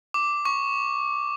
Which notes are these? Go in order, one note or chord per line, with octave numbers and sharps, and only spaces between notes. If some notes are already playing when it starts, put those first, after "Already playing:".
D6
C#6